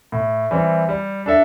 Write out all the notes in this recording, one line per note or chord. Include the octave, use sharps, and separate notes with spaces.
A2
E3 G3 C4
G3
D4 A4 E5